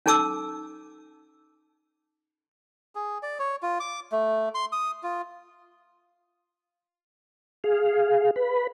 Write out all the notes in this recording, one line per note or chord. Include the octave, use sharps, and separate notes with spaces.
C#4 D#4 A4 A5 D6 E6
G#4
D5
C#5
F4
D6
A3
C6
D#6
F4
G#4 F5
B4 B5